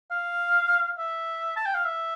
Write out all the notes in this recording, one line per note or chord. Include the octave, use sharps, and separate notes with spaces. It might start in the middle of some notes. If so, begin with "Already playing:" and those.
F5
E5
A5
G5
F5
E5